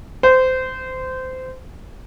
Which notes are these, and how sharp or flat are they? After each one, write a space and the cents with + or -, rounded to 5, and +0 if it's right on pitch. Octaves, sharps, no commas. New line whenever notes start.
C5 -20